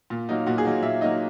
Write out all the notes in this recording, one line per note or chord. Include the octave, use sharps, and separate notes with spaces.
A#2
F#3 A#3 D#4
A#2 F#4
G#4
F#3 A#3 D#4
A#2 E5
F#3 A#3 D#4 D#5